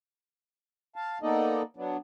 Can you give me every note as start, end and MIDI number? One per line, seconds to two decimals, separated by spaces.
0.96 1.18 77
0.96 1.18 81
1.23 1.62 58
1.23 1.62 59
1.23 1.62 63
1.23 1.62 69
1.23 1.62 74
1.23 1.62 75
1.77 1.97 54
1.77 1.97 59
1.77 1.97 62